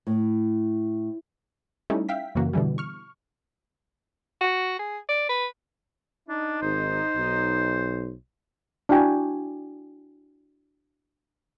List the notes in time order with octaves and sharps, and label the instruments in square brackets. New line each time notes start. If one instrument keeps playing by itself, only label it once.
[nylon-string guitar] A2
[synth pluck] G3 A3 C#4 D#4 E4
E5 F5 G5 B6
F#2 C#3 E3 A#3 F#4
B2 D3 E3 G3
C#6 F6
[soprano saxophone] F#4
G#4
D5
B4
[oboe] D4 [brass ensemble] D#4
[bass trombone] G#1 [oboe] C5
[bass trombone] B1
[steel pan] D4 E4 F#4 G5 G#5